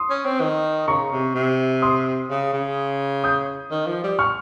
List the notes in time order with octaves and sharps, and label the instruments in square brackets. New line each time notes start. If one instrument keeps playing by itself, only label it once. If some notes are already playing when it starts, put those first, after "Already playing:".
Already playing: [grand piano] C6 D#6
[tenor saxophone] C#4
C4
D#3
[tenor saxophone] C#3 [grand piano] A#5 C#6
[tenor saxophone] C3
C3
[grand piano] C6 D#6
[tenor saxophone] C#3
C#3
[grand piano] D#6 G6
[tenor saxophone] D#3
F3
G3
[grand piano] C#6 F6